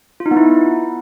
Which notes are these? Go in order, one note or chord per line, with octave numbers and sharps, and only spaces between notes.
F4
D#4
B3
E4